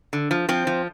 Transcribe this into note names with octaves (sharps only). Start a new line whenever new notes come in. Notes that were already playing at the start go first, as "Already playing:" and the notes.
D3
F3
F3 C4
F3